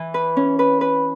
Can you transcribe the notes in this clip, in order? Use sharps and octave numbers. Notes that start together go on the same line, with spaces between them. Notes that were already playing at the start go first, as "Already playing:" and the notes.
Already playing: E3
B4
C#4
B4
B4